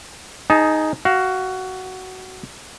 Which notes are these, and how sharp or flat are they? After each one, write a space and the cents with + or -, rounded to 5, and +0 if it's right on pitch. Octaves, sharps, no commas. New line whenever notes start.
D#4 +0 G#4 +10 A5 -25
F#4 +15 F5 +0